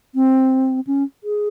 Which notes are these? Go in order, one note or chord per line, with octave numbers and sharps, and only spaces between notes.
C4
C#4
G#4